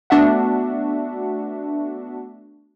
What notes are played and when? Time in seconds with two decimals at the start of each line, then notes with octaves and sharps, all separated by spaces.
0.10 A3 B3 D4 F#4 E5 F#5